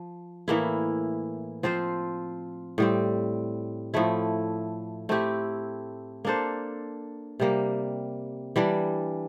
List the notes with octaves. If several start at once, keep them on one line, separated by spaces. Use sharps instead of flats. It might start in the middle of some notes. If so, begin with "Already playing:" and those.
Already playing: F3
A2 E3 A#3 E4
F3 C4 F4 C5
A2 G3 C4
A2 F3 A3 E4
A3 C4 E4 G4
A#3 D4 A4 C5
C3 G3 A#3
E3 G3 D4